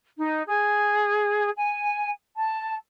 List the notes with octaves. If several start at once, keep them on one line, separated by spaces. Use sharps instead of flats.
D#4
G#4
G#5
A5